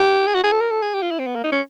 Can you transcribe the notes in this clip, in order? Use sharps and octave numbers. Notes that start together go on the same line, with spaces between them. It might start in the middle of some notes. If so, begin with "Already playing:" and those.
Already playing: G4
G#4
F#4
G#4
A4
A#4
A4
G#4
G4
F4
E4
C4
B3
A#3
D#4
C#4